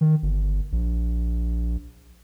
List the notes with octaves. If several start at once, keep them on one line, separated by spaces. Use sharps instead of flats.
D#3
G1
A#1